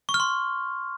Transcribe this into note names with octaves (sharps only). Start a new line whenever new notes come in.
C#6
F6
C6